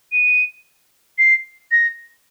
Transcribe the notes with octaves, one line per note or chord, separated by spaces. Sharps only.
D#7
C7
A#6